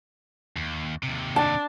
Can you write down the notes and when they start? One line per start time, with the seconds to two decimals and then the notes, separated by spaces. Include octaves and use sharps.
0.56 D#2
1.03 D#2 C3
1.36 D4 A5